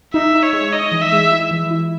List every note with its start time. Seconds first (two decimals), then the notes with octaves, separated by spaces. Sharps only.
0.14 D#4 E5
0.34 D#4
0.43 C#5
0.53 G#3
0.73 D#4 D#5
0.92 E3
1.02 E5
1.12 G#3
1.31 E4
1.51 E3
1.71 E4